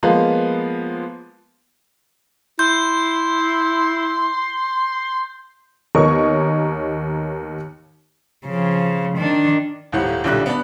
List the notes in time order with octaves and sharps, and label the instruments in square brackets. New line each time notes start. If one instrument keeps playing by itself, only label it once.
[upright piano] F3 G#3 A#3 B3
[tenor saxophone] E4 [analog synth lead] C6 [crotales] G6
[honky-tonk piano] D#2 B3 A#4 C#5 D#5 C#6
[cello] C#3 F3
D#3 D4
[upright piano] D#1 G#1 A2 G3 F#5
B1 A#2 D3 G3 E4 F#6
B3 D4 B5